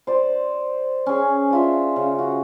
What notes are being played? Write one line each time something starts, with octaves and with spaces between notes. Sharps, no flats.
C5 D5
C#4 G#4
D4 F4 E5
C#3
F#4